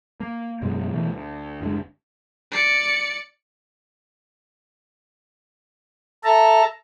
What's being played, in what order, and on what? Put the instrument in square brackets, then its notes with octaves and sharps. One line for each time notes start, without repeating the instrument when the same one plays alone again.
[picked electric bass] A#3
E1 F#2 B2 G#3
B2 E3 A3
D2
F#1 D2 D3 G#3
[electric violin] D5 C#7
[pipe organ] A4 E5 A5 A#5